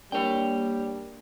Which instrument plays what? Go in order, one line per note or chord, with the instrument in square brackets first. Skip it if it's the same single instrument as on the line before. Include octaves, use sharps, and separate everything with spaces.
[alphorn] G3 [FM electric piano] A#3 D4 [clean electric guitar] C#5 G5